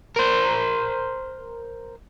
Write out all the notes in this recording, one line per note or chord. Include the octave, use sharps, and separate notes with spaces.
A#4 C5